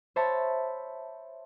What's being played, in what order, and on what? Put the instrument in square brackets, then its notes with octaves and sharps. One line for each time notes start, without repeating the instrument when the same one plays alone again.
[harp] C5 C#5 E5 A5 B5